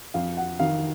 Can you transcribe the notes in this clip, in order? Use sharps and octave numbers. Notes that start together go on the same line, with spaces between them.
F2 F5
F#5
D#3 F5